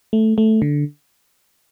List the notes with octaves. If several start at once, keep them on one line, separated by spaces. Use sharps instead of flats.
A3
A3
D3